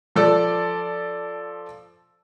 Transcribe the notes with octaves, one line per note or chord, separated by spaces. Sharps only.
F3 A4 D5